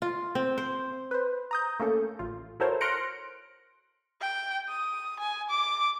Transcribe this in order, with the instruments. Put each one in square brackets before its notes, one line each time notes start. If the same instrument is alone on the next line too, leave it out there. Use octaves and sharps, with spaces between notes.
[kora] F4
C4
C5
[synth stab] B4 C5
A#5 D#6 G6
A3 A#3 C#4 A4
A1 F4
E4 F#4 A4 A#4 C5 C#5
C6 F6 F#6 A#6 C#7 D7
[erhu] G5
D#6
G#5
D6